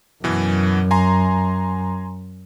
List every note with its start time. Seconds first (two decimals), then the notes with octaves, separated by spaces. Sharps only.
0.24 F#2 B2 E3
0.91 G#5 A#5 C6